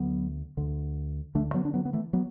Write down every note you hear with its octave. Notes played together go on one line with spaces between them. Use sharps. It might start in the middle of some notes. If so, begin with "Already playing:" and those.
Already playing: D2 D3 F#3 B3
D2 D3
D2 D3 A3 D4
F#3 B3
D4
F#3 B3
B3
E3 A3
F#3 B3